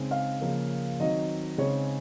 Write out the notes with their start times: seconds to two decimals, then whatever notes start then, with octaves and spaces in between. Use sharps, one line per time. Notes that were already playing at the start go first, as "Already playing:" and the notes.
Already playing: C#3 G#3 C4 D#4
0.11 F5
0.41 C#3 F3 A#3
1.00 D#3 F#3 C4 D#5
1.58 C#3 G#3 C4 D#4 C#5